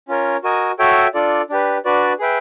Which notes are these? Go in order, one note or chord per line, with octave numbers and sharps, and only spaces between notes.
C#4 F4 A#4 C#5
F#4 A#4 D#5 G#5
F#4 A4 C#5 E5 G5
D4 F4 A4 D5
D4 G4 B4
D4 F#4 B4 D5
G#4 B4 E5 G5